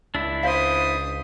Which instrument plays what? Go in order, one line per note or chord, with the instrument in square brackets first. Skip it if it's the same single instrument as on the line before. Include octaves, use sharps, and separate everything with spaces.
[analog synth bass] C#2 [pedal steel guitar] D4 E4 [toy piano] E6
[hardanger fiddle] C5 D#6 [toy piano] C#5 F5